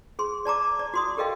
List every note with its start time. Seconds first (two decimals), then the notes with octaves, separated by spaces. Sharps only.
0.19 G#4 C6
0.45 D5 A5 A#5 D6
0.79 D5
0.94 F#4 C6 D#6
1.17 G4 A4 A#4 D#5 F5 G5